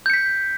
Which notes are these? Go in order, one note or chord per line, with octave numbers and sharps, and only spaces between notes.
G6 B6 C#7